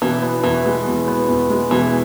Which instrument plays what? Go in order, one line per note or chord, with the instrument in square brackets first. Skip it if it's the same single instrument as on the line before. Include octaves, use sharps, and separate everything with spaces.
[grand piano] B2 [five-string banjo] E3
[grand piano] B3
[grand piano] E2 [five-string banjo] E3
[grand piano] G#3
B2
B3
E2
G#3
[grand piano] B2 [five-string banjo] E3